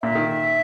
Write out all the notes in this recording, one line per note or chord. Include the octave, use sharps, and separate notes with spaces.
A#2 E5
D#3